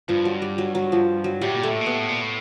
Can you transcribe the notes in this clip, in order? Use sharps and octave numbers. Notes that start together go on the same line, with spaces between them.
G2 F3
F#3
G3
F#3
F#3
F3
F#3
A2 G3
A#2
A2 A3
A#2
B3
A2
A#2
A2